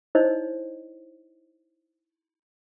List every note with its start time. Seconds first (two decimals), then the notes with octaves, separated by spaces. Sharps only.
0.15 D#4 E4 C5 C#5 D#5